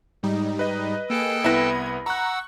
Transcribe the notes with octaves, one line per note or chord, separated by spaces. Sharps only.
G#2 G3 D#4
B4 D#5
A#3 G#4 A4 G5 A5 D7
C2 B3 E4 B4 G#6 A#6
F#5 A#5 C#6 E6 F#6